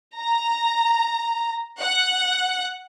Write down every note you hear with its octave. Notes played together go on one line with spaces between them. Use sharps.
A#5
F#5